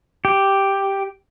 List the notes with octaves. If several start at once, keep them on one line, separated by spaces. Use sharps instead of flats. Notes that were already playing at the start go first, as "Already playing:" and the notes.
G4